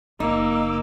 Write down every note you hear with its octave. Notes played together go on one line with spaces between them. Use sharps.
F#1 A#3 D#4 D6 E6